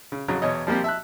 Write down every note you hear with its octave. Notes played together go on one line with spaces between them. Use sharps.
C#3
F2 C#3 F#3
E2 B2 C#5 D#5
F3 G3 A#3 C4 G4
E5 A5 F#6